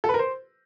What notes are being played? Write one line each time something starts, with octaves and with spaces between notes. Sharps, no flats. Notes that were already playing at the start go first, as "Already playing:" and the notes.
A4
B4
A#4
C5